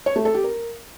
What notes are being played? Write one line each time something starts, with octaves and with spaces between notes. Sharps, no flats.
C#5
A3
A4
G4
A#4